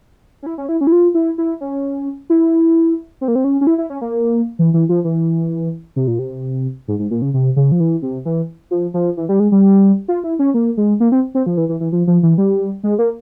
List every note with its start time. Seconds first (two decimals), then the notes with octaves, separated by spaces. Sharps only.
0.43 C#4
0.46 E4
0.58 C#4
0.69 E4
0.81 C#4
0.87 E4
0.92 F4
1.14 E4
1.38 E4
1.61 C#4
2.30 E4
3.21 C4
3.28 A#3
3.35 C4
3.44 C#4
3.61 C#4
3.67 E4
3.78 E4
3.90 C#4
4.01 A#3
4.59 E3
4.74 E3
4.89 F3
5.04 E3
5.96 C3
6.08 A#2
6.19 C3
6.88 G#2
6.99 G#2
7.11 A#2
7.22 C#3
7.34 C3
7.56 C#3
7.72 F3
7.80 E3
8.02 C3
8.25 E3
8.71 F3
8.94 F3
9.17 E3
9.29 G3
9.40 G#3
9.52 G3
10.08 F4
10.24 E4
10.39 C#4
10.54 A#3
10.77 G#3
11.00 A#3
11.12 C4
11.35 C4
11.46 F3
11.57 E3
11.69 E3
11.80 E3
11.92 F3
12.07 F3
12.23 E3
12.38 G3
12.83 G#3
12.99 A#3